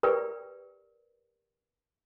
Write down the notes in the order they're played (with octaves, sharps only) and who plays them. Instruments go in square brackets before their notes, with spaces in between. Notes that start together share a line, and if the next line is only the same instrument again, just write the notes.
[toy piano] G4 A#4 B4 D5 G5